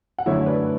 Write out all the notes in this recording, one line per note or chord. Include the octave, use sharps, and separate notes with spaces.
F#5
F#2 D3 A3 E4 C#5 E5
B4 D5